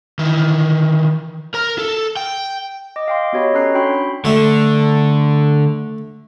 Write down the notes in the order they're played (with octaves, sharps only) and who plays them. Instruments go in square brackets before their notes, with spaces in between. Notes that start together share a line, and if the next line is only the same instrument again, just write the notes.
[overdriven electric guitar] D#3 E3
A#4 A#5
A4
G5
[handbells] D#5 D6
F5 G5 C6
B3 F#4 G4 C#5 D#5 B5
C#4 A4 C#5 A#5 F#6 C7
D4 F#4 G5 B5 C6
B5
[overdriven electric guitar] D3 [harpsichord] A3